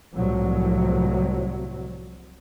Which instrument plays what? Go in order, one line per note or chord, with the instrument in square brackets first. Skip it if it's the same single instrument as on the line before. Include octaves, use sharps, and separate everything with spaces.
[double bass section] C2 A2 C3 F3 F#3